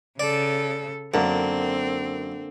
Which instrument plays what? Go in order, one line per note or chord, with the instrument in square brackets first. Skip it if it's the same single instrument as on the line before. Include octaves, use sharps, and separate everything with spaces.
[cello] C#3 A4 [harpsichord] D5
[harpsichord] F#2 [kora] D3 A#3 [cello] C4